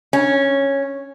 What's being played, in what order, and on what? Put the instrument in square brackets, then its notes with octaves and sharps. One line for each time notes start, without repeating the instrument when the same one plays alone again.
[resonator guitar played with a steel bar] C#4